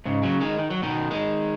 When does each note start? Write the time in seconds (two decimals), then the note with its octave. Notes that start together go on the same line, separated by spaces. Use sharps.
0.05 G#2 C#3
0.23 C#3 F#3
0.40 D#3 G#3
0.59 D#3
0.71 F#3
0.82 B2 D#3
1.11 D#3 G#3